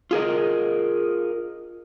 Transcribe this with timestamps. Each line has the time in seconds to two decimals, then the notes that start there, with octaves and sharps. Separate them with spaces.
0.11 F4 G#4 A#4 D#5